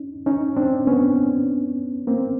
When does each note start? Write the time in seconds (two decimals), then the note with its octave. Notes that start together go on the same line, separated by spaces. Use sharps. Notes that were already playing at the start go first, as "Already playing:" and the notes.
Already playing: C#4 D#4
0.26 C#4 D#4
0.56 C4 D4
0.87 B3 C#4
2.07 A#3 C4